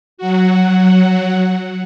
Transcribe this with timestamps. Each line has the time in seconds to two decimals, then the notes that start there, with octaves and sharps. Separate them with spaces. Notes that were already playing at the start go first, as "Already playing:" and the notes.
0.18 F#3 F#4